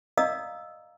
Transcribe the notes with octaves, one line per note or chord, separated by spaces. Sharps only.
D5 D#5 F5 A#5 D#6 E6